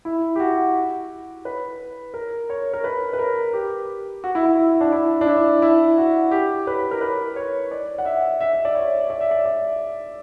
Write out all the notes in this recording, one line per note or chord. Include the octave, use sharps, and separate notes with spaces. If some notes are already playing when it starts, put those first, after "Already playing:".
E4
G4
F#4
B4
A#4
C#5
A#4
B4
B4
A#4
G4
F#4
E4
E4
D4
E4
D4
E4
E4
F#4
G4
B4
A#4
B4
C#5
D5
F#5
E5
E5
E5
D5
C#5
D5
E5
D5
D5